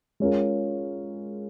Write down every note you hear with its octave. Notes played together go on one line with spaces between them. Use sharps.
G#3 C#4 F4 A#4